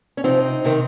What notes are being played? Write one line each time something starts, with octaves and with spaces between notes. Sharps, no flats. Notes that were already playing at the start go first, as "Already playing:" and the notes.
C#4
C3 F3 C4 D#4
C3 D#3